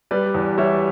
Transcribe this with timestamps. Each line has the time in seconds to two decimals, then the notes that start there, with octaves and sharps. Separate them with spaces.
0.11 G3 B4 D5
0.34 E2
0.58 G3 C#5 E5